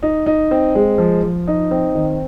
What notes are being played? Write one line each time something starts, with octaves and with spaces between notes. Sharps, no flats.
D#4
D#4
C4
G#3
F3
F3
D#4
C4
D#3